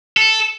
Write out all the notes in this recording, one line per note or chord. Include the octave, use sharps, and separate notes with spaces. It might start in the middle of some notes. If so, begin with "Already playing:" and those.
A4